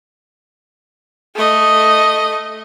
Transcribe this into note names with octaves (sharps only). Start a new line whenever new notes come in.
A3 D#5